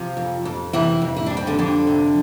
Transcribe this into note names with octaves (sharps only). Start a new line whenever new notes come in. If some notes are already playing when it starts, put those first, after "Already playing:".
Already playing: C3 F3 F4
F2
F2
C3 E3 E4
F2
E4
G3 D4
C4
D3 D4
F2 D3 D4
C3